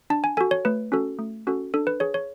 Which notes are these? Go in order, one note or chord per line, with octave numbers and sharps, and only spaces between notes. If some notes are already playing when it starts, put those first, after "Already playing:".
D4 A5
G#5
F#4 A4 G#5
C#5
A3 B4
C#4 F#4 A4
A3
C#4 F#4 A4
D4 A4
B4
G#4 C#5
C#5